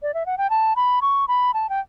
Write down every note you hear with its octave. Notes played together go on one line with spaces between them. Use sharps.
D5
E5
F#5
G5
A5
B5
C#6
B5
A5
G5